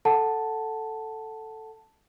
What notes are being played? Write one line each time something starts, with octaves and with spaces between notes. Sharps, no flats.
A4 F#5 A5